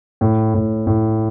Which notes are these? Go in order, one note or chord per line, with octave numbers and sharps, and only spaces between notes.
A2
A2
A2